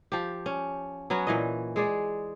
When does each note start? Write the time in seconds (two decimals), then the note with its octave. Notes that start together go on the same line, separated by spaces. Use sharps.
0.12 F3 G4
0.46 C#4
1.10 F#3 B3 C#4 F#4
1.27 A#2 E3 D#5
1.76 G#3 G#4 D5